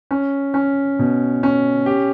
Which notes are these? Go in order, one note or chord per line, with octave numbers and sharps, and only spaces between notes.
C#4
C#4
B2
C#4
G4